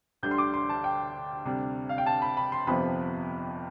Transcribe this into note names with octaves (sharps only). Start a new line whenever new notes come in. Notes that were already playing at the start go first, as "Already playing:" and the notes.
D2 D3 G3 D4 G6
C6
D6
C6
A5
G5
D2 C3 G3 D4
F5
G5
A5
B5
B5
C6
G1 F2 C3 F3 B3 B5